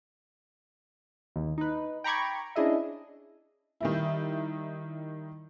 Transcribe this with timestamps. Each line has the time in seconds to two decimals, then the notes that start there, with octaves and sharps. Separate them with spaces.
1.36 D#2
1.58 D#4 B4
2.04 G5 A#5 B5 C#6 D6 G#6
2.56 C#4 D4 E4 G#4 D#5 E5
3.81 D#3 G3 E4